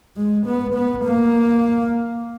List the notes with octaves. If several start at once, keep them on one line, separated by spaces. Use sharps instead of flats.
G#3
B3
B3
A#3